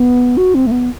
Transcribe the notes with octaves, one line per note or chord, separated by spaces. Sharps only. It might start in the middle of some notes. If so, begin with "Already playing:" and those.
Already playing: B3
F#4
C4
A3
B3